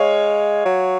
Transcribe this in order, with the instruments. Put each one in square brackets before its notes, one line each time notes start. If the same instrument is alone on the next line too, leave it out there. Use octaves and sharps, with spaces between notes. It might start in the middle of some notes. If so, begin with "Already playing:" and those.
Already playing: [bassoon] G#3 [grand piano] C#5 F5
[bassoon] F#3